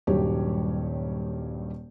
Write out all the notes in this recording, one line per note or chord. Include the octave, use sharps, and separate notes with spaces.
D#1 G2 D#3 F#3 G4 C#5